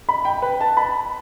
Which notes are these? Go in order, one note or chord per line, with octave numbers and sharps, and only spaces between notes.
B5
G5
B4
A5
B5